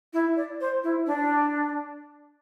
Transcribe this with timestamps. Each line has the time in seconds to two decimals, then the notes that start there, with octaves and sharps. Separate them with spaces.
0.13 E4
0.37 D5
0.61 C5
0.83 E4
1.06 D4